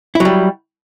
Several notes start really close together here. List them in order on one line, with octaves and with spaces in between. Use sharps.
E4 F#3 G3